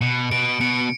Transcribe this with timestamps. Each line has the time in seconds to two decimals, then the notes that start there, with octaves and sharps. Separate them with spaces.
0.01 B2 C#7
0.31 B2 D7
0.61 B2 C#7